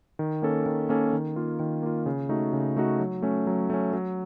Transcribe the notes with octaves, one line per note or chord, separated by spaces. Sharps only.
D#3
A#3 C#4 A4
D#3
A#3 C#4 A4
D#3
A#3 F4
D#3
A#3 F4
C#3
A3 D#4 F#4
C#3
A3 D#4 F#4
F#3
A3 C#4
F#3
A3 C#4
F#3